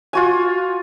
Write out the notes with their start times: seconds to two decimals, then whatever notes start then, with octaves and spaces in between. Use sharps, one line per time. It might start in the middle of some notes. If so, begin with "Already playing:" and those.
0.13 F4 F#4 G#5